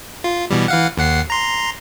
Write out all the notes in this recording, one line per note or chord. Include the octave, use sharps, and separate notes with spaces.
F4
B2 E3 G3
E3 F5 F#5
D#2 F#5 C7
A#5 C6